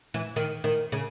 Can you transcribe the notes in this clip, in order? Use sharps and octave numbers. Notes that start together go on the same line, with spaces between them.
E3
D#3
D#3
C#3